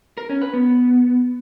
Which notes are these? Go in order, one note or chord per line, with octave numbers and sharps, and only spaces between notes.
A#4
C#4
B4
B3